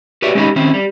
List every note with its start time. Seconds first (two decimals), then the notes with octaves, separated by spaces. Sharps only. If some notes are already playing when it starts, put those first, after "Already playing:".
0.22 F#4 G4 B4 C#5 D5 E5
0.35 G#3 C#4 D#4 G4 D#5 B5
0.56 D#3 C4 C#4 E4
0.74 G3